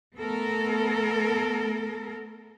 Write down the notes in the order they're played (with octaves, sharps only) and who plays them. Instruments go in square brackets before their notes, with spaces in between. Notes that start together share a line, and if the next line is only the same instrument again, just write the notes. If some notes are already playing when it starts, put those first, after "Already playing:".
[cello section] A3 B3 A4 A#4